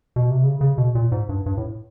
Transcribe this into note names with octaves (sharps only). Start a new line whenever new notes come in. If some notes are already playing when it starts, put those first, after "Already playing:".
B2
C3
C#3
C#3
B2
A#2
G#2
G2
G2
A2